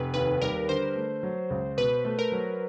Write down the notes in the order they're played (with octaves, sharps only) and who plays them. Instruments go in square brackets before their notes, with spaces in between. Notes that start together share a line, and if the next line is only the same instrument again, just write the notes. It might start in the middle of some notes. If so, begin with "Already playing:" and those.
Already playing: [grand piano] F1 [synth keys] A4 B4
[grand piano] D#2 [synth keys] B4
[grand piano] G3 [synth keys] A#4
[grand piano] D3 [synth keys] C5
[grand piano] A3
F#3
C#2
[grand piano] B2 [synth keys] B4
[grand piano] A3
[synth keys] A#4
[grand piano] F#3